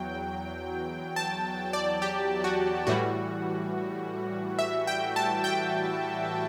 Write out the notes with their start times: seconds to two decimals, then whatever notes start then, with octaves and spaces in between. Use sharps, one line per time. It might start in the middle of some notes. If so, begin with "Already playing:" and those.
Already playing: E2 F#3 G5
1.16 A5
1.73 D5
2.02 G4
2.44 F#4
2.87 A2 E3 G3 F#4
4.59 E5
4.87 G5
5.16 A5
5.44 G5